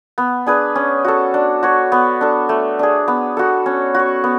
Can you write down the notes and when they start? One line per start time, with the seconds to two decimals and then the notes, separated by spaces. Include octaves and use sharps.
0.18 B3
0.46 D4 G#4 B4
0.75 C#4
1.04 F#4 A4
1.34 D4
1.63 F#4 C#5
1.92 B3
2.21 D4 A4
2.49 A3
2.79 D4 G#4
3.08 B3
3.37 F#4 A4
3.66 C#4
3.94 F#4 C#5
4.24 B3